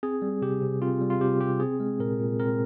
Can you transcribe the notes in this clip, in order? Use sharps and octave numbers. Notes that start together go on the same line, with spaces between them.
C4 G#4
G3
C3 G4
C3
C4 F4
G3
F4
C3 G4
C3 G4
C4 G#4
G#3
A#2 A#4
A#2
C4 A#4